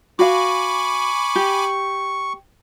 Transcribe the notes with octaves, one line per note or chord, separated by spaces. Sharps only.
F#4 F5 G#5 B5 C#6 D6
G4